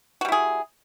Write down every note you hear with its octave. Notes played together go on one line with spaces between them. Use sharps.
G3 E4 F#4 G#4